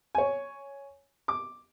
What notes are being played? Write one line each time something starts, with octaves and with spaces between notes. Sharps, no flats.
C#5 G#5
D6